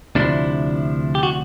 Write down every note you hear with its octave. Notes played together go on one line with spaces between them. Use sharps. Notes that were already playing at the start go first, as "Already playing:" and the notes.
D2 C3 F3 D4 E4
G4
F#4